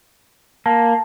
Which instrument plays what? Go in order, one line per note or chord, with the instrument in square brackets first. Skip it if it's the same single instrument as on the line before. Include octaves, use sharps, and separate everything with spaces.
[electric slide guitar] A#3 [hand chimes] A5